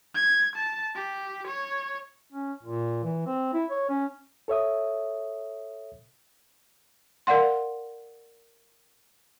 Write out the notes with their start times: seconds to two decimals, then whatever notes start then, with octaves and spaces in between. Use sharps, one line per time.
0.15 G#6
0.56 A5
0.95 G4
1.47 C#5
2.31 C#4
2.63 A#2
3.04 E3
3.26 C4
3.53 E4
3.70 C#5
3.89 C#4
4.48 A4 C#5 E5 D#6
7.27 A#4 D5 F5 F#5 C6